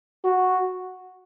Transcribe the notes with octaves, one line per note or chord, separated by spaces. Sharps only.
F#4